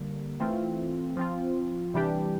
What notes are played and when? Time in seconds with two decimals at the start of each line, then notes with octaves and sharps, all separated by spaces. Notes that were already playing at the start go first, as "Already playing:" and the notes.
Already playing: D3 G3 A#3
0.40 E3 A3 C4 F4
1.17 F3 C4 F4
1.94 C3 E3 G3 D4 G4